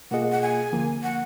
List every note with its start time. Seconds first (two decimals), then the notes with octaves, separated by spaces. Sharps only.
0.11 B2 A#3 F4 G#4 D#5 F#5
0.32 F#5
0.42 G#5
0.72 D2 D3 F3 A#3
1.03 F#5